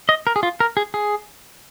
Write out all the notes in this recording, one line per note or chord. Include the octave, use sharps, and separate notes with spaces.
D#5
A#4
G#4
F4
A#4
G#4
G#4